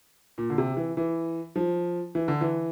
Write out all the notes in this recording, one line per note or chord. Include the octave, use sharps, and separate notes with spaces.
A#2
D3
C3
E3
E3
F3
E3
D3
E3